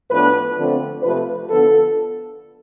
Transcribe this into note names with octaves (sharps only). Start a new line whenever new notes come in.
A2 F3 B3 D4 B4
D3 F3 A3 C4
C3 F3 A3 B4
D3 F3 B3 D4 A4